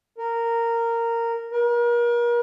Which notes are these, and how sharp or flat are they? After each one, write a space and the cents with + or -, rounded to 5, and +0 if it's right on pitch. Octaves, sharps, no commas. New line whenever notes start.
A#4 -10
A#4 +40